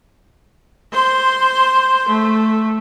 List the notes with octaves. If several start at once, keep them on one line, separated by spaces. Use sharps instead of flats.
C5 C6
A3